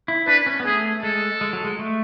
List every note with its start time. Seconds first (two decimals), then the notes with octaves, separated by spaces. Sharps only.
0.08 E4
0.27 D4 B4
0.46 C#4
0.60 B3
0.65 A3 G#4
1.03 G#3 A4
1.41 G#3
1.53 F#3
1.65 G#3
1.79 A3